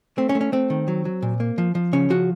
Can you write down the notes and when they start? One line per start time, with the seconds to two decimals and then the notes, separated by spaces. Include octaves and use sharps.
0.18 A3 C4
0.29 C#4
0.35 A3
0.41 C#4
0.52 A3 C4
0.70 D#3
0.88 F#3
1.05 F#3
1.22 A#2
1.40 A#3
1.58 F3
1.75 F3
1.93 C#3 C#4
2.10 F3 F#4